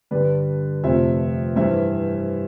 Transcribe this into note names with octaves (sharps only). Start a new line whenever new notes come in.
G2 D3 G3 B4 D5
F2 C3 F3 A3 C5 E5
G2 E3 G3 C5 E5